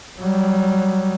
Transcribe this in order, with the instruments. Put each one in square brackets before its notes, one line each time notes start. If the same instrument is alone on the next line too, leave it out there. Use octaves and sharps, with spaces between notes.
[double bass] F#3 G3